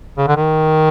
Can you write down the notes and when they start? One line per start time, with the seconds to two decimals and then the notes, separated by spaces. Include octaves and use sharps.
0.17 C#3
0.27 D3
0.37 D#3